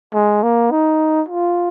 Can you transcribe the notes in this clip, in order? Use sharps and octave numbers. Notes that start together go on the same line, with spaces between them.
G#3
A#3
D#4
F4